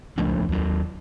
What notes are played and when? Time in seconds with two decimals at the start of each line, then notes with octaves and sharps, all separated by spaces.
0.18 C#2 F3 A3 D4
0.49 D#2 F#3